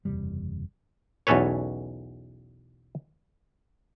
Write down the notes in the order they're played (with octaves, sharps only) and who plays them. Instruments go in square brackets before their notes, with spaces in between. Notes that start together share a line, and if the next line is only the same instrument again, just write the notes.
[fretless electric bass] F#1 E2 C3 G3
[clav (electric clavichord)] B1 E2 C#4 A4 B4 C#5